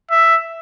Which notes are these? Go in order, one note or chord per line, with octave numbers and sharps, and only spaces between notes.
E5